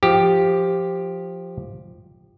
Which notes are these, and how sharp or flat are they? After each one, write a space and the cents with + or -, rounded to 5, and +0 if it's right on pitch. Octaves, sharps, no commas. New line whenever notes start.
F3 +0 G4 +0